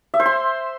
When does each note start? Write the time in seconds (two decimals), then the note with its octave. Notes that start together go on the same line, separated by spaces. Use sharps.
0.14 E5
0.20 C5
0.26 C6